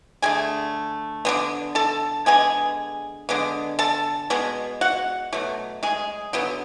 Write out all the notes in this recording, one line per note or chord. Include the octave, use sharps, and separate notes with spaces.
D3 A3 G#4 G#5
D3 G#3 B3
A4 A5
D3 G#3 B3 G#4 G#5
D3 G#3 B3
A4 A5
B2 G#3 B3
F#4 F#5
B2 F#3 A3
G#3 G#4
D3 F#3 B3